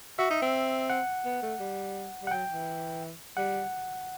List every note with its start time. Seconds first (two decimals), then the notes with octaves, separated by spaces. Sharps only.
0.19 F#4 E5
0.30 D#4
0.42 C4
0.90 F#5
1.25 B3
1.42 A3
1.60 G3
2.23 G3
2.27 F#5
2.31 F#3 G5
2.49 E3
3.37 G3 F#5